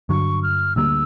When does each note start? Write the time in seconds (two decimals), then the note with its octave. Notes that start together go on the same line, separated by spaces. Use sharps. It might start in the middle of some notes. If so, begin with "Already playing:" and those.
0.09 G2 D3 F#3 C#6
0.43 F6
0.76 D2 D3 G3 A#3 E6